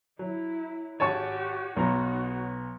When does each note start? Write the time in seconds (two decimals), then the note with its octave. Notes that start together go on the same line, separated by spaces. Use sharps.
0.19 F#3 E4
1.00 G#1 F#4 G4 C#5 G#5 A5 C#6
1.76 B1 B3 D#4 F#4 A#5